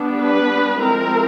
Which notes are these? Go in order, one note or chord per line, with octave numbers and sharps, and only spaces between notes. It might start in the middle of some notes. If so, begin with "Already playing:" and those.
Already playing: G3 B3 D4
B4
F3 G#3 C4 E4 A#4